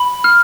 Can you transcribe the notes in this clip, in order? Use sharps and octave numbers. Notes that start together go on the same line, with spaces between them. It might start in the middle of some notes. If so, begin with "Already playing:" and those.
Already playing: B5
F6